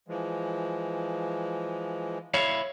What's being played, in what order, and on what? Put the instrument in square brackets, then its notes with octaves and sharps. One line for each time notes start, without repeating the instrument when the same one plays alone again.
[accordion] E3 F3 G#3
[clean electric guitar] E4 C#5 F5